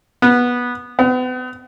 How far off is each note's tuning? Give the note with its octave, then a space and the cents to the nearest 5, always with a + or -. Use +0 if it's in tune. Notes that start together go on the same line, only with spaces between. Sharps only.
B3 -15
B3 +40